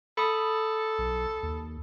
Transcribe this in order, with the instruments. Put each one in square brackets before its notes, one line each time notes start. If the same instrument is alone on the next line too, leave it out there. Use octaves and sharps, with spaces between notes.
[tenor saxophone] A4 [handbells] B5 D#6
[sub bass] B1
D#2